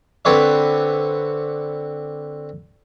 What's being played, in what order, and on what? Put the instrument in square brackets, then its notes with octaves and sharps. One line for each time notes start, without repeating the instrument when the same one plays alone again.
[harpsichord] D3 C4 B4 C#5 D5